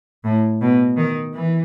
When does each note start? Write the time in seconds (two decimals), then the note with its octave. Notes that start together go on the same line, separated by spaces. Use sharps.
0.24 A2
0.61 B2
0.97 D#3
1.33 E3